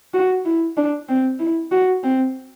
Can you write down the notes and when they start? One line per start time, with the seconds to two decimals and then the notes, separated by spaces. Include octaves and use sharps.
0.14 F#4
0.45 E4
0.77 D4
1.09 C4
1.39 E4
1.71 F#4
2.03 C4